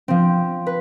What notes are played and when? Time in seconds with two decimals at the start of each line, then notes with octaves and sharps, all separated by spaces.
0.08 F3 C4
0.67 B4